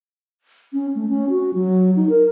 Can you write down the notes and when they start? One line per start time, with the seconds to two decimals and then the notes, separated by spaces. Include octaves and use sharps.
0.73 C#4
0.95 A3
1.09 C#4
1.30 F#4
1.54 F#3
1.96 D#4
2.09 A#4